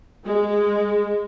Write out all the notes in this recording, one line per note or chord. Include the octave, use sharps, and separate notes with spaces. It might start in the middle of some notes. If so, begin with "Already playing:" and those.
G#3